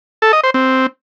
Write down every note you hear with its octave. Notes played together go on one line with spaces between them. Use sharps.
A4
D#5
C5
C4